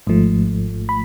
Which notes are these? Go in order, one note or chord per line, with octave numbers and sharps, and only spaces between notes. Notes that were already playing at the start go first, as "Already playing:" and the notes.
G#1 G#2 F3 A3
B5